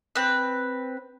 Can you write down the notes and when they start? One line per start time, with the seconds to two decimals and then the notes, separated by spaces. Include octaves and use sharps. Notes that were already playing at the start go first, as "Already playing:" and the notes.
0.16 C4 B4